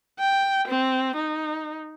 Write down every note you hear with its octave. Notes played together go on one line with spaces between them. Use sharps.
G5
C4
D#4